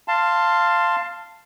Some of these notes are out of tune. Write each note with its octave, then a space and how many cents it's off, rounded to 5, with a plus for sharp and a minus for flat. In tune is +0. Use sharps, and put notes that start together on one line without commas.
F5 -10 A5 +15 C6 +0